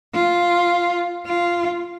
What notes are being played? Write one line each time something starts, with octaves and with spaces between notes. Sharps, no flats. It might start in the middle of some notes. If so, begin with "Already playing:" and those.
F4
F4